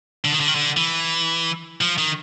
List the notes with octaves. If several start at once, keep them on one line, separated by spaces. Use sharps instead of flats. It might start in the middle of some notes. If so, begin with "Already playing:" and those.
D3
D#3
D3
D#3
D3
E3
F3
D#3